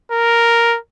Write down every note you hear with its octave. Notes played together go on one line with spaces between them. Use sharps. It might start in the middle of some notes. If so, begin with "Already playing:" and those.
A#4